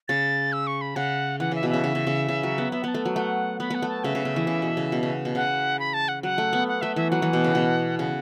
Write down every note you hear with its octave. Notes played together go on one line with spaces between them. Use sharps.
C#3 A6
E6
C#6
B5
C#3 F#5
E3 F#5
C#3 E5
B2
C#3 E5
C#3
C#3
C#3
C#3
F#3
B3
B3 E5
B3 A5
A3
F#3
A3 F#5
B3 B5
B3 F#5
A3
A5
C#3 E5
C#3
C#3
E3
C#3
B2
C#3
B2
C#3
B2
C#3 F#5
B5
A5
F#5
F#3 F#5
A3
B3
F#5
A3 E5
E3 E5
F#3 F#5
E3
B2
C#3
B2
C#3 F#5